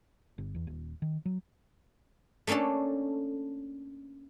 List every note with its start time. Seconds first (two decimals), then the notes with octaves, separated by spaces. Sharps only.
0.38 G1
0.54 E2
0.67 D#1
1.02 D#3
1.25 F#3
2.47 A3 A#3 C#4 D4 A4